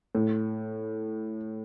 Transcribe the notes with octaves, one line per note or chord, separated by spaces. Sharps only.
A2